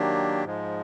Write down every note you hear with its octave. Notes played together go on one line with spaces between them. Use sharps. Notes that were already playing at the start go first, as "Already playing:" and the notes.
Already playing: D#3 F#3 A#3 D4 G4
G#2 F3 G#3